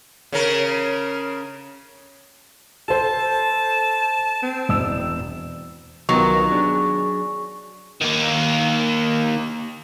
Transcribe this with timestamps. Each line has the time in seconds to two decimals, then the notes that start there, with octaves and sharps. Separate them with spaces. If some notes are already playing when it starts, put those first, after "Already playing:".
0.32 C#3 C#4 A#4
2.88 A4 C5 A5
4.42 C4
4.69 E1 E6 E7
6.09 C2 D#3 F#3 B3 F4 C#6
6.52 D4 G#4
8.02 D#3 A#3